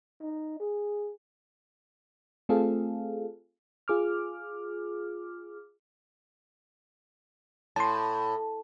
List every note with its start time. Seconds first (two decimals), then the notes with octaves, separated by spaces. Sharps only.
0.22 D#4
0.60 G#4
2.49 A3 C4 F4 G#4 A4 F5
3.88 F4 G#4 D6 F6
7.76 A2 A5 C6